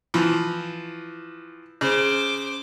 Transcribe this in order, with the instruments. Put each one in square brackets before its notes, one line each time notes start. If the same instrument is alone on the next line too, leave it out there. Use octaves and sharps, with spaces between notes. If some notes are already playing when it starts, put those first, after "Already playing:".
[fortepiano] E3 F3
[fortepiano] C#3 [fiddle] C5 D6